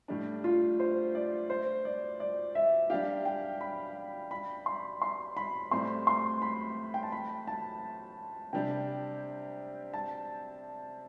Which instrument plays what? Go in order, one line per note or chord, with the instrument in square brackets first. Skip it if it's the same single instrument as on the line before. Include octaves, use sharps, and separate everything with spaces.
[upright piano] A2 G3 D4
[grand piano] F4
C5
D5
C5
D5
D5
E5
[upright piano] G3 D4 G4 [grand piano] F5
[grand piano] G5
B5
B5
C6
C6
B5
[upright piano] A2 G3 C4 [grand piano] C6
[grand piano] C6
B5
G5
A5
B5
A5
[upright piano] C3 G3 D4 G4 [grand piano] G5
[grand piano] A5